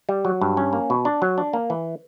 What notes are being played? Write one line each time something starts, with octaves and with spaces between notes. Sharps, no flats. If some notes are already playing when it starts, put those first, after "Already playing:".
G3
F#3
G2
C#4
A#3
B2
D4
F#3
D4
A#3
E3